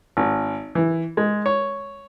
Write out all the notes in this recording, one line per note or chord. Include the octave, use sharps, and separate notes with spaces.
G#1
E3
G#3
C#5